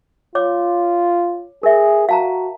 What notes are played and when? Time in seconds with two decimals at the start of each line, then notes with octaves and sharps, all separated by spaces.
0.35 F4 C#5 D6
1.63 G#4 A#4 E5
2.09 F#4 F5 A5 A#5